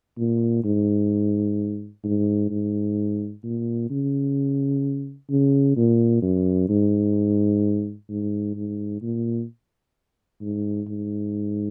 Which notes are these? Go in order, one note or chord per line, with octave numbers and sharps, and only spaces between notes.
A#2
G#2
G#2
G#2
A#2
C#3
C#3
A#2
F#2
G#2
G#2
G#2
A#2
G#2
G#2